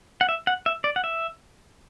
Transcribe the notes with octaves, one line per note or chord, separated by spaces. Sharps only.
F#5
E5
F#5
E5
D5
F#5
E5